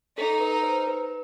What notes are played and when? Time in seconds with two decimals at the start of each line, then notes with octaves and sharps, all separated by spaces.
0.17 D#4 A4
0.40 B4
0.63 C5
0.87 B4